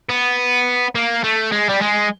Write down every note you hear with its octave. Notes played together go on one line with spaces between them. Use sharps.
B3
A#3
A3
G#3
G3
G#3